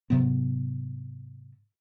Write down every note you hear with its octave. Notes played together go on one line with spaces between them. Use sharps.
G#2 C3 F#3 B3